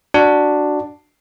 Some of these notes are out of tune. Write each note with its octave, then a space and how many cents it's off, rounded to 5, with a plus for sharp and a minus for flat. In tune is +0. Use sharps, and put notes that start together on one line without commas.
D4 +5 F#4 +0